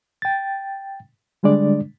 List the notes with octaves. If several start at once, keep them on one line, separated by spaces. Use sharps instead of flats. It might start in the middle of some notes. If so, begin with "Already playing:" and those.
G5 A6
D3 G3 G#3 D4 D5